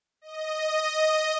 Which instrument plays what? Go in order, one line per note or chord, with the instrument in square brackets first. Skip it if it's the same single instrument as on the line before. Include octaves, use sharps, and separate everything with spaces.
[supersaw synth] D#5